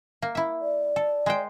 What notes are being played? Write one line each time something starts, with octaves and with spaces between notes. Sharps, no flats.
A#3
E4 E5
D5
A4
G#3 C5 G5